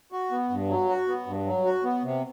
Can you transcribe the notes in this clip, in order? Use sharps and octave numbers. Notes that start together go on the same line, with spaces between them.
F#4
B3
G2
F#3
F#4
B3
G2
F#3
F#4
B3
C3